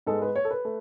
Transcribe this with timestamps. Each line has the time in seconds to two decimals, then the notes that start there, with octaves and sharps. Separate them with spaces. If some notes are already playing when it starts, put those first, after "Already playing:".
0.06 G#2 G#3 B3 A4
0.22 B4
0.36 C#5
0.45 A4
0.51 B4
0.65 A3